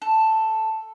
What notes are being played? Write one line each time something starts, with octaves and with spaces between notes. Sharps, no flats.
A4